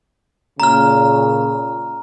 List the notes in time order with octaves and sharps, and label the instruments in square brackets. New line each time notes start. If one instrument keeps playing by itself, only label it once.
[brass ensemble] A#2 C#3 [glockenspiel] A#5 F6